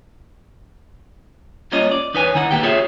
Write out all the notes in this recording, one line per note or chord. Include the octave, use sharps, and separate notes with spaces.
G3 A#3 C#4 F4 C#5 D#5
D5
E2 D#4 B4 C#5 G#5
D#2 D#3 D#4 E4 F#5
B1 A#3 B3 G4 G5
F4 G4 G#4 C5 C#5 E5